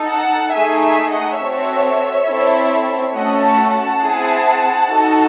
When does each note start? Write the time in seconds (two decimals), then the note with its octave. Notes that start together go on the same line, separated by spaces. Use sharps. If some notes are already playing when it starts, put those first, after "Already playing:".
Already playing: D#4 A4
0.09 F#5 A5
0.53 A3 D#4 G#4 E5 G#5
0.82 E5 G#5
1.11 D#5 F#5
1.40 C4 F#4 A4 C#5 E5
2.28 C4 E4 A4
3.15 A3 C#4 F#4 A4 D#5 F#5
3.44 F#5 A5
3.74 F#5 A5
4.03 C4 E4 G#4
4.90 D#4 F#4 A4